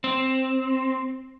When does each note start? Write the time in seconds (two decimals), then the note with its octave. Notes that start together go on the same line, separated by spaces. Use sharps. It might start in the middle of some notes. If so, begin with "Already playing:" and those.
0.04 C4